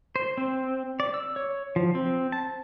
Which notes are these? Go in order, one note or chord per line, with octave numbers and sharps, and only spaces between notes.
C5
C4
D5
E6
C#5
F3
C4
A5